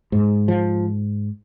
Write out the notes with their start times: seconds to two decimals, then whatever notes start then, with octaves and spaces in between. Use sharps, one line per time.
0.12 G#2
0.48 F3